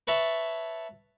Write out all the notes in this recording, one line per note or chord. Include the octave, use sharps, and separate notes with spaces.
B4 C#5 E5 A5